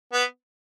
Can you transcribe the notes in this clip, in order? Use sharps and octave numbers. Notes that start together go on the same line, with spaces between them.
B3